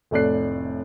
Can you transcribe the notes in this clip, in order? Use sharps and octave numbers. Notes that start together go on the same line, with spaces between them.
F1 A2 A4 D5 F#6 C7